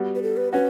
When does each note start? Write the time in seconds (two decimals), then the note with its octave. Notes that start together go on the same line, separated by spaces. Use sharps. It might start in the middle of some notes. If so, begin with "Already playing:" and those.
Already playing: G3 B3 F#4
0.15 B4
0.22 A4
0.37 B4
0.53 C#4 F#4 B4